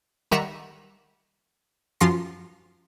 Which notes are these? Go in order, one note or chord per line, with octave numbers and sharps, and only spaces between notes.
D#3 G3 E5 F#5 A#5
F#2 F3 F4 C6 A#6